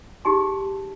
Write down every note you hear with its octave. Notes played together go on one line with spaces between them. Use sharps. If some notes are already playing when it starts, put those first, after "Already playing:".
D#4 G4 G#4 A5 C6